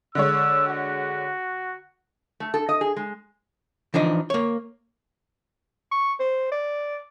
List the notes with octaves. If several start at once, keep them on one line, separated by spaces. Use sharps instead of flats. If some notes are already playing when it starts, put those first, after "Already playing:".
D3 G#3 C#5 E6
F#4
A3
A4
D#5
G#4
G#3
E3 F3 D4 D#4
A#3 C#5
C#6
C5
D5